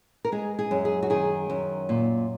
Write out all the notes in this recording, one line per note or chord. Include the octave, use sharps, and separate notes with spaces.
A#4
G#3 G#4
G#4
F#2
G#4
F#4
D#3 G#4
F#2
A#2